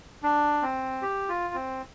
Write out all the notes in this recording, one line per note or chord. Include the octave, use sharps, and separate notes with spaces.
D4
C4
G4
F4
C4